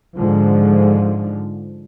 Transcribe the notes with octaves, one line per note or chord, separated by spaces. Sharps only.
G#2 D3 F3